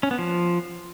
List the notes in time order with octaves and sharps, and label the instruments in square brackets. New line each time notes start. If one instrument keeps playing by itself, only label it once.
[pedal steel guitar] C#4
B3
F3